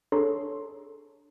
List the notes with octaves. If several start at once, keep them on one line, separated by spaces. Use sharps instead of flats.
D4 G#4 A4 C#5 A#5 C6